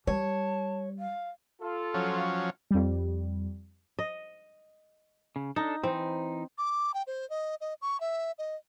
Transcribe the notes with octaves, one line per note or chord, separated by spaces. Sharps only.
G3 C#5 A5
F5
F4 A4
F3 F#3 C#4
F2 G3
D#5
C#3
D4 D#4 A4
E3 C4 D#4
D6
G5
C5
D#5
D#5
C#6
E5
D#5